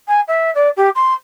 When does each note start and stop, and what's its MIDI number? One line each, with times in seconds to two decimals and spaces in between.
0.08 0.21 80
0.28 0.53 76
0.55 0.69 74
0.77 0.89 67
0.95 1.13 84